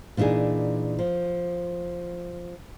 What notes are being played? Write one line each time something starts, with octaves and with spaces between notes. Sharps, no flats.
A#2 E3 D4 D#4 G#4
F3